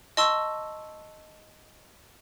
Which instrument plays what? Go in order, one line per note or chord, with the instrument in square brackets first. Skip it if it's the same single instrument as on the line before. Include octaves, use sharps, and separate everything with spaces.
[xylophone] D#5 A5 C6 C#6 E6